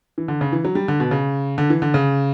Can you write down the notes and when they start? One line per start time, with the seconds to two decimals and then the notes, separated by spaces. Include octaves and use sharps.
0.18 E3
0.28 D3
0.41 C#3
0.53 E3
0.65 F#3
0.75 G3
0.88 D3
1.00 B2
1.11 C#3
1.58 D3
1.70 E3
1.82 D3
1.94 C#3